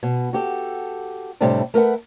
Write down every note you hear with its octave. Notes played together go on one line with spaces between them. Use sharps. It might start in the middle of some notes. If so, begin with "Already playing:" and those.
B2
F#4 G4 A4
A2 C3 G3 A3 C4 D4
A3 A#4 B4 F#5